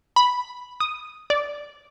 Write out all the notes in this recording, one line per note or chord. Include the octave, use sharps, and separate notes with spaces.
B5
D#6
D5